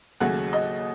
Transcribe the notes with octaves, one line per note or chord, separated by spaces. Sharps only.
D#2 C#3 F#3 A3 F#5
D#5